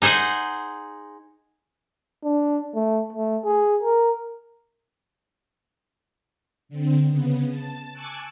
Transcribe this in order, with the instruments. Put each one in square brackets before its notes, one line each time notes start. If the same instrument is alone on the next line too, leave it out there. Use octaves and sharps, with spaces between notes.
[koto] D#4 G#4 C5 F#5 G#5
[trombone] D4
A3
A3
G#4
A#4
[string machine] D3 C4
C#3 B3
A5
G#5 A5 C#6 D6 E6 F#6